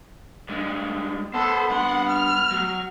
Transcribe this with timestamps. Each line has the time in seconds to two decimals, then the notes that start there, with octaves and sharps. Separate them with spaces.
0.49 G2 G#3
1.34 B3 A4 B4 C5
1.70 G2 F#5 C6
2.09 F6
2.51 F#3